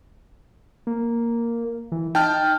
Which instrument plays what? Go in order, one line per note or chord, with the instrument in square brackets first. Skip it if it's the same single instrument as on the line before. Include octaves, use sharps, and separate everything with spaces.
[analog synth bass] A#3
E3
[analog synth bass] D#4 [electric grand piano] G5 A5 F6